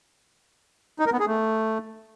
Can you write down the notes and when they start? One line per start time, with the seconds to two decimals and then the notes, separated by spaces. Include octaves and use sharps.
0.99 D#4
1.06 A#4
1.13 B3
1.20 G#4
1.27 A3